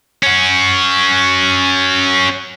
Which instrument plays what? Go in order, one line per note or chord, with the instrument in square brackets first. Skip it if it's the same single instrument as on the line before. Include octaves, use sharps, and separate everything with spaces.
[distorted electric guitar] C#4 F#4